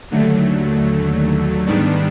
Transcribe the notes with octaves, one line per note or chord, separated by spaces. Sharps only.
D#2 D3 F#3 A3
G#2 D#3 G3 B3 D4